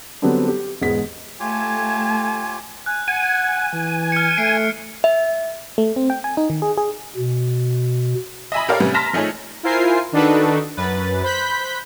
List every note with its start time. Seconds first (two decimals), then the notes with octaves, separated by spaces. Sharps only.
0.22 D3 F#3 G3 B3 C4 D4
0.48 G4
0.81 E1 G#2 B3 G#4 B6
1.40 A3 F4 G4 C#5 G#5 A5
2.86 G#5 F#6
3.08 F#5 G#5
3.73 E3
4.12 F6 C#7
4.38 A3 C7 D7
5.04 E5
5.78 A3
5.96 C4
6.10 G5
6.24 G#5
6.37 D#4
6.50 D#3
6.62 G#4
6.77 G#4
7.16 B2
8.52 D#5 E5 G#5 B5
8.68 G4 A4 A#4 C#5 D5 F5
8.80 C3 G3 A3 B3 C#4
8.94 A5 A#5 C6 F6 A#6 B6
9.13 F3 A3 D#4 G#4 A4 C#5
9.63 E4 F4 A#4 C5 G#5 C7
10.12 D#3 D4 D#4 F#4 A4 B4
10.77 F#2 B4 A6
11.23 C5 B5 F#6 G6 B6